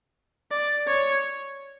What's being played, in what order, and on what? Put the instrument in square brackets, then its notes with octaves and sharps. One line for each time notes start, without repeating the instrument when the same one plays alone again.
[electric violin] D5
C#5